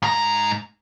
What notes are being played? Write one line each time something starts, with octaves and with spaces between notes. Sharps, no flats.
G#2 A#5